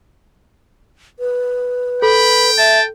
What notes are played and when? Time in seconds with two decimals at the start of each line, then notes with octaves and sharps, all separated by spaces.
1.20 B4
2.02 A4 G5 B5
2.58 E5 A5